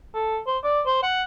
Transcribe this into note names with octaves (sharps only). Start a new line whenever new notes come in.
A4
C5
D5
C5
F#5